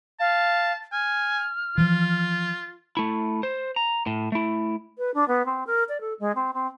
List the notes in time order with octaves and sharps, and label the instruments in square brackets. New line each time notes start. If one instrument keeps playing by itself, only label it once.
[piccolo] F5 [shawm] A5
[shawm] G#5 [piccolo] F6
[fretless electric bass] E3 F3 [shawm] F4
[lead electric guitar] A3 E4
C5
A#5
A2
A3 E4
[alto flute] B4
D4
B3
C4
A#4
D5
A4
G#3
C4
C4